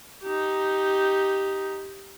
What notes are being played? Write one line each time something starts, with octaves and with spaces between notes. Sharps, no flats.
D#4 G4